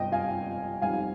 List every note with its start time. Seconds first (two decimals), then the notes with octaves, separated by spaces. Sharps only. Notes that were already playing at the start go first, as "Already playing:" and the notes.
Already playing: G1 F2 C3 D#5 G5
0.12 F5 G#5
0.82 F2 D#3 G3 F5 G#5